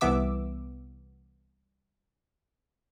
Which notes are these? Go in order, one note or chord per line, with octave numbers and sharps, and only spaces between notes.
C2 E3 B3 E5 D6 E6